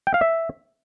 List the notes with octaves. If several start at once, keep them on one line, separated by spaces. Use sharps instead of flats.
G5
F5
E5